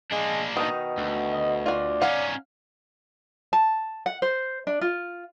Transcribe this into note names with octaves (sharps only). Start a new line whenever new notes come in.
G#3 A#3 D4
B2 D#3 D#4
D2
D#5
F4 F#4 D5
C#4 D#4 F5 F#5
A5
F#5
C5
D4
F4